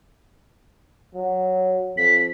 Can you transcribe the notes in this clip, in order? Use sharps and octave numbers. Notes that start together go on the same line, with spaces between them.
F#3
F2 B6